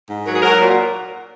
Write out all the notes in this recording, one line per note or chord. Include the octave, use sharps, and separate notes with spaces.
G#2
F#3 A#4
G#4
F#3 A#4
A#2